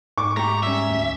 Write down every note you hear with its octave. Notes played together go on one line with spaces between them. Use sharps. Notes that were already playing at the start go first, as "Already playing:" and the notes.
G#2 C#6 D6
A3 G4 A#5
G3 C#4 E5
D2